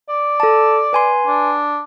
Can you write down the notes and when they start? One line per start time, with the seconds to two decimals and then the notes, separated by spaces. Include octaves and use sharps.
0.10 D5
0.40 A4 A5
0.93 B4 G#5 C6
1.27 D4